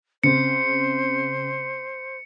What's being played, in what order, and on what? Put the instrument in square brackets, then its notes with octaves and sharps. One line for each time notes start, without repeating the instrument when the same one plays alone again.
[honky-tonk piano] C#3 C4 [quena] C5 [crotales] C#7